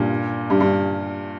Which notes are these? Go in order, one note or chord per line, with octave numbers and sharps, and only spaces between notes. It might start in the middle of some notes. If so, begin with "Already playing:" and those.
Already playing: G2 A#2
G2
G2